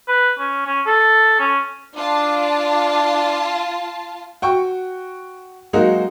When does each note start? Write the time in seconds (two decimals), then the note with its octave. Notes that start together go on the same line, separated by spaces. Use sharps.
0.08 B4
0.39 C#4
0.66 C#4
0.86 A4
1.39 C#4
1.95 D4 F4 A5
4.42 F#4 G5 C#6
5.73 F#3 G#3 A#3 D#4 F#4 A#4